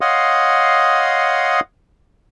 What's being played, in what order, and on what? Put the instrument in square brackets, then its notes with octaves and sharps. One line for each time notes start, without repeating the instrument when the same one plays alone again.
[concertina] C#5 D#5 F5 F#5 C6 D#6